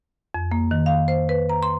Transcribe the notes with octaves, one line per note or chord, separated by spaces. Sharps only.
F2
A#3
D#3
F5
C5
B4
A#5
C6